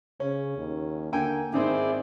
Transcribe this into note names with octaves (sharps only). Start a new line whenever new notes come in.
C#3 C#4
D#2
D3 A#3 G5 G#5
G#2 D#3 C4 E4 G#4 C5 D5